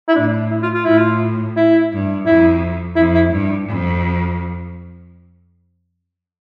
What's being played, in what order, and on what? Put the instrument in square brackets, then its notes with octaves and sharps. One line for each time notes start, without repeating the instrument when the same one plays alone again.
[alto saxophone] E4
[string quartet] A2 [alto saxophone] D4
[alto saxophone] E4
F4
F4
[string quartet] A2 [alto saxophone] E4
[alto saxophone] F4
E4
[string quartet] G2
[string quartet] F2 [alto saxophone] E4
[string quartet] F2 [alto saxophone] E4
[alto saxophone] E4
[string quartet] G2
F2